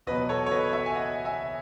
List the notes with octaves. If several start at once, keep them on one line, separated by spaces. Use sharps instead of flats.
E2 B2 F#3 B4 D#5
A4 C#5
C#5
B4 D#5
C#5 E5
G#5
D#5 F#5
E5 G#5